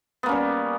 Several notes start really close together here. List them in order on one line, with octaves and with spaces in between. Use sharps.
B3 A#3 C#4 G3